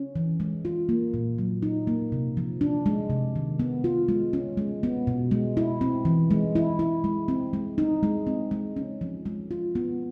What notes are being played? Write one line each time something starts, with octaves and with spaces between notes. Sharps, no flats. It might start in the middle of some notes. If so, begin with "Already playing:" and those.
Already playing: C#4
E3
G#3
F4
A#3
A#2
F#3
D#4
A#3
C3
F3
D4
G#3
C3
D#3
B3
F4
G#3
C#4
G#3
B3
B2
G#3
E4
C4
E3
G#3
E4
E4
G#3
C4
G#3
D#4
G#3
C4
G#3
C#4
F3
G#3
F4
B3